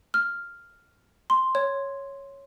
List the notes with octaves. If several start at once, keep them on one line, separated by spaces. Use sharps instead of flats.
F6
C6
C#5